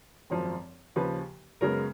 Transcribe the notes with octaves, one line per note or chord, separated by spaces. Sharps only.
G#1 F#2 F3
D#2 C#3 F3 B4
F#2 C#3 G#3 B3 A#4